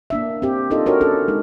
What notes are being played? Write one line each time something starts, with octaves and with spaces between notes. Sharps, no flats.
A#3 D4 E5
C4 G4
D4 D#4 F4 G4 A4 D#5
D4 F#4 G4 A#4 C#5
C#4 D4 A4
G#3 D#4